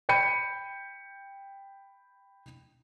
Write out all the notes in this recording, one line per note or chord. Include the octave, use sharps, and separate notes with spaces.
G5 B5 G6 C#7 D#7